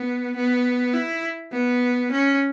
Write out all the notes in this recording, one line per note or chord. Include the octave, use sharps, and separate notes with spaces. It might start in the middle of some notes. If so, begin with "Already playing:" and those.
Already playing: B3
B3
E4
B3
C#4